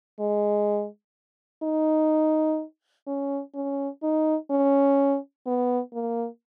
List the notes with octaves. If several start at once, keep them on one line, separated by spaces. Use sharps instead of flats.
G#3
D#4
C#4
C#4
D#4
C#4
B3
A#3